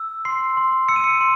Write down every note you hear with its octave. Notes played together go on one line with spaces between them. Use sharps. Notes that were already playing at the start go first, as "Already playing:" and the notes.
Already playing: E6
C6 C7
C6
E6 C#7
D#7
C#7
C6